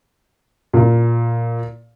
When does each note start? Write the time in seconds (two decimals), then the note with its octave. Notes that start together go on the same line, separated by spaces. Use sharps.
0.73 A#2